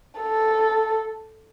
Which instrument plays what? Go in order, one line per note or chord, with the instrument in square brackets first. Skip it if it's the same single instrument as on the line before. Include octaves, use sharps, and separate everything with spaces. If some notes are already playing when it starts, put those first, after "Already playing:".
[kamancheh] A4